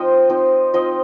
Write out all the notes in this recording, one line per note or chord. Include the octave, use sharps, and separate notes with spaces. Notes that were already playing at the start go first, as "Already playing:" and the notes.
Already playing: F3 C4 D#4 D#5 G5
F3 C4 D#4
F3 C4 D#4 D#5